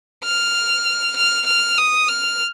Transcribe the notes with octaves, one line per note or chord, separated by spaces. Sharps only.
F6
F6
F6
D#6
F6